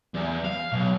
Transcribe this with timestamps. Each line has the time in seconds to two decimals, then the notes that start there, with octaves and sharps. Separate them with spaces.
0.14 E2
0.44 F5
0.72 B1